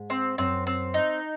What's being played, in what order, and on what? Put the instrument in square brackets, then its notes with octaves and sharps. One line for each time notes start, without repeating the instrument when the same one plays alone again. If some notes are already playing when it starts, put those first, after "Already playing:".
Already playing: [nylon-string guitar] G#2
[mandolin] C4
[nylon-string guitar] F#2 [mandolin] C4
[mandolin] C4
D#4